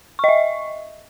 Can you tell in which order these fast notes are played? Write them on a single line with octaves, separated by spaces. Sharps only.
C#6 D#5 E5